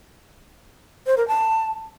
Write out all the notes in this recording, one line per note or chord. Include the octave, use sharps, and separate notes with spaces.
C5
A#4
A5